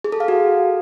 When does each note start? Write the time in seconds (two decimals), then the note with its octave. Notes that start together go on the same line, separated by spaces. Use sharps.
0.04 G#4
0.12 A4
0.20 F5
0.28 F#4